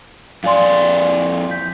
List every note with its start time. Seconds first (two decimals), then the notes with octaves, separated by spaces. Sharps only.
0.44 F2 D5 F5 G#5 C6
1.51 G6 B6